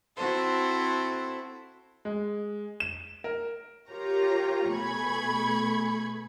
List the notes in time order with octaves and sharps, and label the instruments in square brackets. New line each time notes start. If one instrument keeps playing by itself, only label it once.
[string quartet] C4 E4 F#4 A4 C5
[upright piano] G#3
E7
A#4
[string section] F4 G4 A#4 C#5 A#5
B2 A3 G#4 B5 C#6 G#6